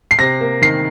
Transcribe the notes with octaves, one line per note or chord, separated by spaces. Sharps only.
C7
C3 A#6
A#3
D#3 C7